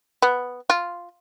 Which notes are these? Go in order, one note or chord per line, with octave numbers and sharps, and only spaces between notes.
B3
F4